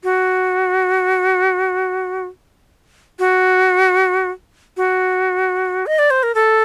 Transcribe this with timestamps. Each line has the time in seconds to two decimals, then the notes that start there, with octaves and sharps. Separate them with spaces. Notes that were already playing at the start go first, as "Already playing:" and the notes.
0.04 F#4
3.19 F#4
4.77 F#4
5.86 D#5
5.99 D5
6.10 C5
6.23 A#4
6.35 A4